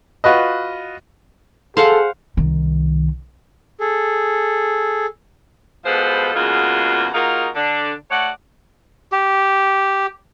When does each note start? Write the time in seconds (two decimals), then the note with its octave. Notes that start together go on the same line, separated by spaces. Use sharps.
0.24 F4 F#4 B4 D#5
1.77 G#4 A4 C5 F5 F#5
2.37 C2 D#3
3.80 G#4 A4
5.85 B2 F3 G#3 A4 B4 C5
6.35 E2 C#3 G#3 A#3 F4 F#4
7.14 A#3 D#4 F4 F#4 G#4 A#4
7.55 D3 D4
8.11 A3 F#4 C#5 D5 F#5
9.12 G4